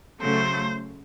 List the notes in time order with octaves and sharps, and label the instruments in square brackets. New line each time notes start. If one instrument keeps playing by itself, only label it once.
[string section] C#3 F#3 A3 [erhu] C5